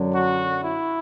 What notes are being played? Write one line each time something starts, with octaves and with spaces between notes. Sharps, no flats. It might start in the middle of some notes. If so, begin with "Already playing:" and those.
Already playing: F#2 D3 F#3
F#4
E4